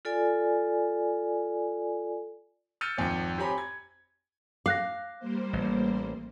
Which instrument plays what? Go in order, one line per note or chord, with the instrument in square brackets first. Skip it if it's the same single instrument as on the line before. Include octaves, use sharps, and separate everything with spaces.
[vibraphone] F4 A4 D5 G#5
[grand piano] E6 F6 G6 A6 C#7 D#7
G#1 F2 F3 G5 C#7
C4 G4 C#5 G#5 A#5 B5
G#6
[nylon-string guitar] F5 [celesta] D6 F#6 A#6
[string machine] G3 A#3 C5
[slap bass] A1